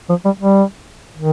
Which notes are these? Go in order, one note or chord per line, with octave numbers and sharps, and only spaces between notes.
F3
G3
G3
D#3